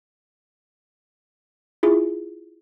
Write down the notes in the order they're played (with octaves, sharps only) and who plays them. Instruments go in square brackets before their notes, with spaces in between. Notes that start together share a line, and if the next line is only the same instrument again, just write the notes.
[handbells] E4 F4 G#4